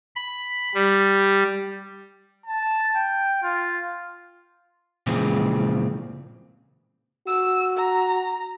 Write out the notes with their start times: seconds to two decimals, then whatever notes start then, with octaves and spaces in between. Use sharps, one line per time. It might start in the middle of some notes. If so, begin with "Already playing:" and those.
0.16 B5
0.75 G3
2.46 A5
2.96 G5
3.43 F4
5.07 A#2 C#3 E3 F3 G#3 C4
7.27 F#4 E6
7.78 A#5